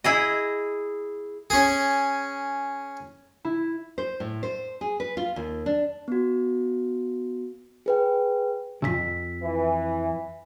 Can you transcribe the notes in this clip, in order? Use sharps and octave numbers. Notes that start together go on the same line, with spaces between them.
E4 G#4 D#5
C#4 G#4
E4
C5
A2
C5
G#4
B4
F4
D#2
D4
B3 F#4
G#4 B4 G5
B1 F2 E6 B6
E3